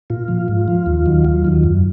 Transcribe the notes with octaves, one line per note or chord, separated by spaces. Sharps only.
A#2 F4
F3
G#2
F3
D#2
D#3 F#3
D#2
D#3 F#3
F#2